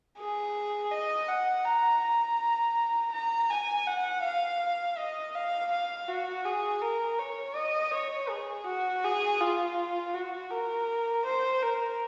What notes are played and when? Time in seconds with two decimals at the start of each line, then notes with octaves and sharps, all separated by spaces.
0.18 G#4
0.91 D#5
1.28 F#5
1.65 A#5
2.02 A#5
3.13 A#5
3.50 G#5
3.87 F#5
4.23 F5
4.98 D#5
5.35 F5
5.71 F5
6.08 F#4
6.45 G#4
6.82 A#4
7.18 C#5
7.56 D#5
7.93 C#5
8.30 G#4
8.66 F#4
9.04 G#4
9.40 F4
10.14 F#4
10.51 A#4
11.25 C5
11.62 A#4